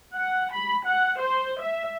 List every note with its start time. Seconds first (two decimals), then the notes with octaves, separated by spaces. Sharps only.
0.15 F#5
0.53 B5
0.86 F#5
1.19 C5
1.60 E5